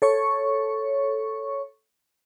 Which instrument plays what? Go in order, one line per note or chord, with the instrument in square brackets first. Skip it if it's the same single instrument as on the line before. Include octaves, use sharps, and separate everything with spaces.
[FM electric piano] A4 C#5 C#6